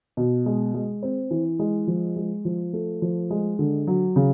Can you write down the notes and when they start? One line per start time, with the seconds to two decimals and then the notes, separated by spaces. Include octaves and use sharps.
0.17 B2
0.46 G#3
0.74 G#3
1.03 C4
1.31 E3
1.59 G#3
1.87 F3
2.16 G#3
2.45 F3
2.73 A3
3.02 F3
3.30 G#3
3.59 D3
3.87 F#3
4.16 C#3